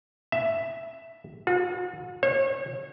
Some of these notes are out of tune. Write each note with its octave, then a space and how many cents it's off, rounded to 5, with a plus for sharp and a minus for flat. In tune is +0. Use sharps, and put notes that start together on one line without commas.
E5 +5
F#4 -45
C#5 -35